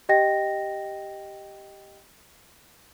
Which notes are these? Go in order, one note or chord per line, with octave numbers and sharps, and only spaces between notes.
G4 D#5 G5 A#6